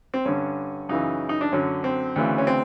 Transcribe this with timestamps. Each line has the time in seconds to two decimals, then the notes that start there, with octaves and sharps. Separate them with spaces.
0.14 C4
0.25 G2 D3 C#4
0.89 F#2 C#3 E3 D#4
1.29 D#4
1.41 D4
1.52 F#2 D3 C#4
1.84 C4
2.16 D2 C#3 E3
2.38 C#4
2.47 C4